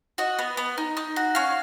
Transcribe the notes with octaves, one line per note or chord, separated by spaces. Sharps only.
F#4 D#5
B3
B3
D#4
D#4
F#4
C#4 F5